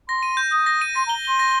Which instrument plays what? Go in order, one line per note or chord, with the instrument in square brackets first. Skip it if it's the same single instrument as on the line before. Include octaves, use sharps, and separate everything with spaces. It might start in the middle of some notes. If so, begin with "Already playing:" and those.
[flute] C6 [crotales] A#6
[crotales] D#7
G6
[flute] D#6 [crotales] G6
[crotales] A#6
D#7
[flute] C6 [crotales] A#6
[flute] A#5
[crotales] G7
[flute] C6 [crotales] G7
[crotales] A#6